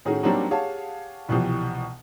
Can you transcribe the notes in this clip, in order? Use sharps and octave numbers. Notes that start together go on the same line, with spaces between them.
A2 D#3 C#4 D#4 F#4 G#4
F#3 G3 A#3 C4 D4 D#4
G4 G#4 C#5 F5 F#5 A5
C2 B2 E3 F3 G3